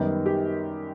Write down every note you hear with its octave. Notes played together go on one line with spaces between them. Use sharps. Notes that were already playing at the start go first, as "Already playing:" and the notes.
Already playing: F#2 D#3 G3 B3 D#4
G4